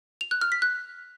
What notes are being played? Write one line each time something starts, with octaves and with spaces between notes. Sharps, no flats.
F7
F#6
F6
B6
F#6